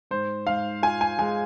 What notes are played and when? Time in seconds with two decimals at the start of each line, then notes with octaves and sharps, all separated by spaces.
0.11 G#2 C5
0.47 G#2 F5
0.83 F4 G#5
1.01 G#5
1.19 G#3 G#5